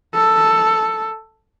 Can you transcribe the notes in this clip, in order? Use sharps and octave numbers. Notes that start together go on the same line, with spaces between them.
A4